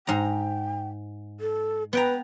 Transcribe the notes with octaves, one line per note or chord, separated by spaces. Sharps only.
G#2 G5 A#5
A4
B3 B4 G5 A#5